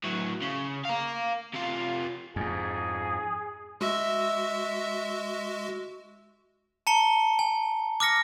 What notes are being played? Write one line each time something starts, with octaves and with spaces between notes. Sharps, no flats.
A2 F#3
C#3
F5 A#5
C3 F4
F2 G#2 G#4
G#3 F#4 E5
A5 A#5 C#7 G7
G#5
D6 F6 A#6 C#7